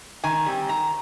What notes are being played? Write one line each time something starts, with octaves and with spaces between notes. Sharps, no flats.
D#3 G#5
G3 C4
D#3 A#5